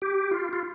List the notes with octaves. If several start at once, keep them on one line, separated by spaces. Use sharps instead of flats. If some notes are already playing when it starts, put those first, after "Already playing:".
G4
F4
F4